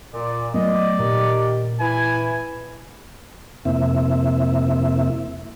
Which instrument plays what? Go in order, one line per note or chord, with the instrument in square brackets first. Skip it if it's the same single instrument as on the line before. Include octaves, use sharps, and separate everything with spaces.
[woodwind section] A#2 [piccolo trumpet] D5
[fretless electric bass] F#3 A3 B3 [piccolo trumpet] D5 [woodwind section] D#5
[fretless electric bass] A#2 [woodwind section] D#3 G4
[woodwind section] E3 E4 [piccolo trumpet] G#5
[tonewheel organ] F2 C3 A#3 C4 E4 E5